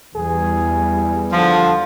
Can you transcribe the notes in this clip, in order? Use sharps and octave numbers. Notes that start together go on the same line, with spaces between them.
E2 E3 G3 G#4
D3 F3